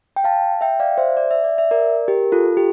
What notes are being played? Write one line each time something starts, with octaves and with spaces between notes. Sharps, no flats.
G5
F5 A5
E5 G5
D5 F5
C5 E5
D5
E5
D5
E5
A#4 D5
G4 A#4
F4 A4
G4